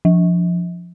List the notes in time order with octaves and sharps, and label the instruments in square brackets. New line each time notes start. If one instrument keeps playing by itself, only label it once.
[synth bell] F3